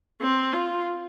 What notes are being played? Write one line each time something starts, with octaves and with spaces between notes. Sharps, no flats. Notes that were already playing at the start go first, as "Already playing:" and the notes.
C4
F4